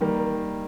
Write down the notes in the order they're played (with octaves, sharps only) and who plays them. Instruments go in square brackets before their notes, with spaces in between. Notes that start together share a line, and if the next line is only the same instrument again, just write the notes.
[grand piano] D#3 G3 A#3